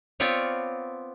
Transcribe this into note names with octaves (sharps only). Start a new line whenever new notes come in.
B3 C4 F4 C#5 D5